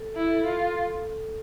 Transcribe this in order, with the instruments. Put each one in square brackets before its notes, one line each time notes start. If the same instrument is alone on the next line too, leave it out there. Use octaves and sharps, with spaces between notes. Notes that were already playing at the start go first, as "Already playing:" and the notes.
Already playing: [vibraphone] A4
[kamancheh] E4
[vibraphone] A4
[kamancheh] F4